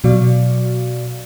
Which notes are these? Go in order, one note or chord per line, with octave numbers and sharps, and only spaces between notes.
B2 F#3 F#4 D5 F5